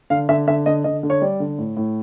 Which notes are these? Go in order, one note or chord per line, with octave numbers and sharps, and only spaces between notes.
D3 F5
D3 E5
D3 E5
D3 D#5
D3 D#5
D3
C#5
G3 D5
D3
A2
A2